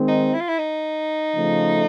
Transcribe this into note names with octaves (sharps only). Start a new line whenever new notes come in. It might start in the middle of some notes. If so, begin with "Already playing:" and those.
Already playing: D#3 G#3 C4
D#4
E4
F4
E4
D#4
C#3 F3 A3